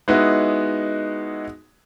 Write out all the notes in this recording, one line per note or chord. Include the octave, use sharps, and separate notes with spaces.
G#3 B3 D#4 E4 F#4